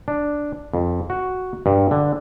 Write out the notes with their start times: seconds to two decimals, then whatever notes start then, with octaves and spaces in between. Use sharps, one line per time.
0.08 D4
0.74 F2
1.10 F#4
1.66 G2
1.91 D3